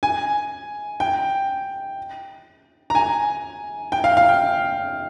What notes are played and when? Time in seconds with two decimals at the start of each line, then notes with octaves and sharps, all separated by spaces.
0.03 G#5
1.00 G5
2.90 A#5
2.95 G#5
3.92 G5
4.04 F5
4.17 F5
4.29 G5